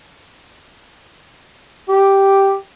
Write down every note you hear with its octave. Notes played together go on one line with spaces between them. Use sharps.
G4